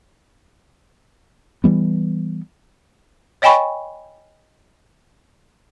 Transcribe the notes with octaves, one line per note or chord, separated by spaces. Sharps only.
E3 G3 B3
C#5 D#5 G5 G#5 B5 C#6